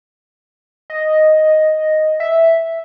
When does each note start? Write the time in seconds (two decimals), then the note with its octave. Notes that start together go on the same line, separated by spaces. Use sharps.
0.90 D#5
2.20 E5